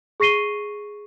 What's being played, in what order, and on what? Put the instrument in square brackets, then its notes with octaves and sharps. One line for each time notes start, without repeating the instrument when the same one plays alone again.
[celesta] G#4 C#6 A#6 C7 D#7 G7